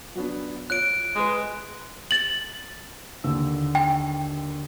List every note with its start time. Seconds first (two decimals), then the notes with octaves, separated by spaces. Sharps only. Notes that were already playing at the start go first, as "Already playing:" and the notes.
0.15 F#3 B3 D4
0.70 F4 C#5 F#6 D7
1.16 G#3 G#4 B4
2.11 A6 F#7
3.24 D#2 D3 E6
3.75 G5